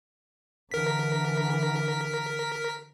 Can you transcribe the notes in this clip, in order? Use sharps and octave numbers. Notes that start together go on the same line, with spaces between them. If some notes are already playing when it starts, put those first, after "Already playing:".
D3 E3 A#4 B6